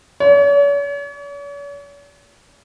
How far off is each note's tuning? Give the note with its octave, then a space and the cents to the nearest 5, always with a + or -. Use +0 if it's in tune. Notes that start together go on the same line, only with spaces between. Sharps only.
C#5 +45